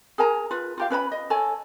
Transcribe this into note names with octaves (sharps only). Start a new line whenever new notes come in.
G#4 A#4 G#5 A#5
F4 B4
F4 G4 F5
C#4 B4 D5 B5
D#5
A4 C#5 G#5